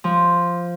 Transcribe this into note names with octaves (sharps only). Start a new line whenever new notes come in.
F3